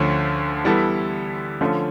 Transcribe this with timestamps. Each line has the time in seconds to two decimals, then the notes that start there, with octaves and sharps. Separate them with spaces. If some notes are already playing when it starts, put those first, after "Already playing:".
Already playing: D2 D3 F3 A3 C#4
0.64 E3 G3 B3 E4 A4
1.61 D3 F3 A3 C#4 F4